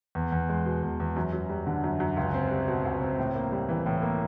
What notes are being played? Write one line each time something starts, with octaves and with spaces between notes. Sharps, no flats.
E2
E2
G#3
B2
E2
E2
F#2
F#2
G3
D3
F#2
F#2
C#2
C4
G3
B2
C#2
C4
A2
A#3
G3
E3
A2
A#3